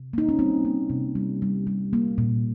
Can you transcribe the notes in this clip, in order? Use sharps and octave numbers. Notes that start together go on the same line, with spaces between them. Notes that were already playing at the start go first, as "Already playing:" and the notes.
Already playing: C3
A#3 D#4
C#4
G3 C4
A#3
C3
G3
G3
G3
A#3
A#2